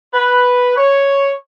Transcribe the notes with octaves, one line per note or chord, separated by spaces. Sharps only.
B4
C#5